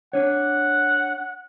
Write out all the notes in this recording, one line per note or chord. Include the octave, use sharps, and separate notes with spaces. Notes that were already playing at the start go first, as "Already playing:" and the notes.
D4 C#5 F#5